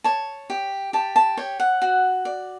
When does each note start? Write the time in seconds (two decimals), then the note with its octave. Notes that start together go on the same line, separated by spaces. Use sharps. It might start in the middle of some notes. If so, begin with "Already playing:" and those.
0.04 C#5 A5
0.50 G4
0.93 G4 A5
1.16 A5
1.37 C#5 G5
1.60 F#5
1.82 F#4
2.25 D5